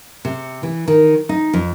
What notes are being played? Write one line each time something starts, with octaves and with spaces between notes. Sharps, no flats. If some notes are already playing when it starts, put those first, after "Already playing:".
C3
E3
D#3
D#4
F2